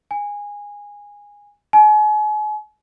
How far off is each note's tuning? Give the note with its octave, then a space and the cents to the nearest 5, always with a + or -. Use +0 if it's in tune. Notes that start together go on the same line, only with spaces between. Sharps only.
G#5 -15
G#5 +40